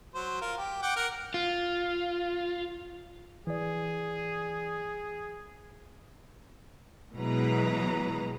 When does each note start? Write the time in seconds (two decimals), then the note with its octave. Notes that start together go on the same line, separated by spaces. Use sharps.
0.14 F#3 C5
0.41 F4 A#4
0.58 G4
0.82 F#5 G5 D6
0.96 A#4 F#5
1.34 F4
3.47 E3 G#4 D5
7.15 B2 E3 F#3 G#3 B4 A#5